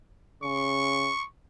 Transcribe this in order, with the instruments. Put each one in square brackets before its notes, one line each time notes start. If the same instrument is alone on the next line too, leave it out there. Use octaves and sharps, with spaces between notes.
[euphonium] C#3 [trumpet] C#6